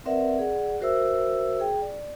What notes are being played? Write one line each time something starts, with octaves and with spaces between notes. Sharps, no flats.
C4 A#4 B4 D5 E5 F#5
G#4 D5 F#5
F#4 A#4 C5 E5 E6
G#4 G5
D5